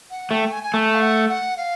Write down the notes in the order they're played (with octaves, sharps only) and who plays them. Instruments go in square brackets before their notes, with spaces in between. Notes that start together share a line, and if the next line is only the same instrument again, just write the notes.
[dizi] F#5
[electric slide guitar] A3 [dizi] G5
[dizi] G#5
G#5
[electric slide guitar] A3 [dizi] A5
[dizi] F5
F#5
F#5
F5